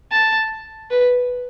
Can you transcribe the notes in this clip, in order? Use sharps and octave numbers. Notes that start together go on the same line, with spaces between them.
A5
B4